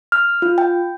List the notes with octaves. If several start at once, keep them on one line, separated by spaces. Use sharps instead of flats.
F6
F4
G5